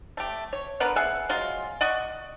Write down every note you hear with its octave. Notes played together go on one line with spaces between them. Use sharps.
A3 G4
C#5
D3 B3 A#4 B4
G#4 E5 F#5
F#3 G#3 F4
D5 D#5 F#5 C#6